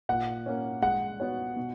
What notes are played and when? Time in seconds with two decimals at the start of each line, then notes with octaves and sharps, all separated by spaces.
0.09 A#2 F#5
0.46 A#3 C#4
0.82 G#3 F#5
1.20 B3 F#4 C#5
1.56 B2